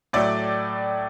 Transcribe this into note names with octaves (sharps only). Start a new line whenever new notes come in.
A2 F#3 A3 D5